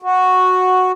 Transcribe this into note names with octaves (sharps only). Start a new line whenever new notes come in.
F#4